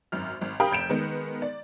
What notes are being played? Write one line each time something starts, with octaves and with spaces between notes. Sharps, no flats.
G#1 F#2 F6
G#1
G4 A#4 F5 G5 B5 D#6
F1 G6 D7 E7
D#3 G#3 B3
D5